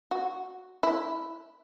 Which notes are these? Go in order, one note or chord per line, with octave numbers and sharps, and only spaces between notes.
F#4
E4